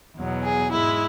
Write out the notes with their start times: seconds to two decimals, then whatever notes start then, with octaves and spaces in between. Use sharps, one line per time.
0.16 E2 B2 F#3
0.44 G#4
0.72 G#2 G#3 E4